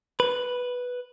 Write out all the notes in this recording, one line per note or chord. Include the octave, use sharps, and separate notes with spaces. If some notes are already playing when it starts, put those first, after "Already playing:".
B4